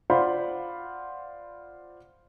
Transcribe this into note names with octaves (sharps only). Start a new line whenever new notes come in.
F4 C5 D5 F#5 B5